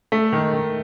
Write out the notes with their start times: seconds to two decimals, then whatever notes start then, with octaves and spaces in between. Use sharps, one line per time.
0.12 A3
0.32 D#3
0.53 D#3